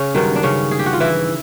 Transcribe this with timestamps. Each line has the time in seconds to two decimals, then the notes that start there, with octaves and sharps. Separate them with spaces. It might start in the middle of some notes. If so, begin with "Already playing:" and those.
Already playing: C#3 C#4
0.15 G2 D#3 F#3
0.36 D4
0.43 C#3 C#4
0.71 G#4
0.79 G4
0.86 F#4
0.93 F4
1.00 E3 E4